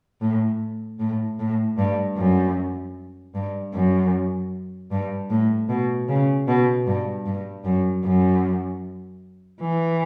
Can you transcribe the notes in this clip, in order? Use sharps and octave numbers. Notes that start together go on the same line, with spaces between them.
A2
A2
A2
G2
F#2
G2
F#2
G2
A2
B2
C#3
B2
G2
G2
F#2
F#2
E3